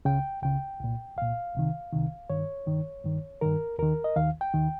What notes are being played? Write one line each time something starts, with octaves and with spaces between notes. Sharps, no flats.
C#2 C#3 G5
C#2 C#3 G5
C2 A#2
C2 A#2 F5
C2 C3 D#3
C2 C3 D#3
G2 D#3 C#5
G2 D#3
G2 D#3
G2 D#3 A#4
D#2 D#3 A#4
D#5
D#2 D#3 F5
G5
D#2 D#3